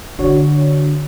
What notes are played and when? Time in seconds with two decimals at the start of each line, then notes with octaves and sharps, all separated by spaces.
0.19 D3 D4 F#4 C#5